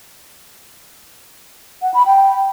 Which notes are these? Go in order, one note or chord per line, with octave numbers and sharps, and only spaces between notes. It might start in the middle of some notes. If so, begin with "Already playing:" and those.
F#5
B5
G5